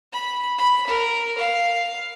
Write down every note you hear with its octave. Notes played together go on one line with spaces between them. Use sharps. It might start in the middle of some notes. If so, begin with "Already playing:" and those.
B5
B5
A#4
F5